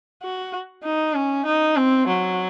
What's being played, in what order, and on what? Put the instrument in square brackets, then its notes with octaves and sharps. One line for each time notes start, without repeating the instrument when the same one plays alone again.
[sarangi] F#4
D#4
C#4
D#4
C4
F#3